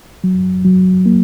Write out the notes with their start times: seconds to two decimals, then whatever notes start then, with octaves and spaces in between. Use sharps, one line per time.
0.24 F#3
0.65 F#3
1.06 A#3